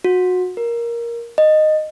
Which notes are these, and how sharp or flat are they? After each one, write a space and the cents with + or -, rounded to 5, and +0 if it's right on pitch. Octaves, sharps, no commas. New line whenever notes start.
F#4 -25
A#4 +10
D#5 -10